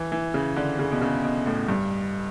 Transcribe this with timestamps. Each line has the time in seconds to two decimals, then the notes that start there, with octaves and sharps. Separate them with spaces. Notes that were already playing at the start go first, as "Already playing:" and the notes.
Already playing: E3
0.12 E3
0.34 C#3
0.56 D3
0.79 C#3
0.92 B2
1.01 C#3
1.24 B2
1.46 A2
1.69 G2